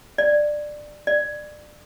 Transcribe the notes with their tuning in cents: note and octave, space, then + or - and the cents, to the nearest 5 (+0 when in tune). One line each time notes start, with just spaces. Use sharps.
D5 +15
D5 +25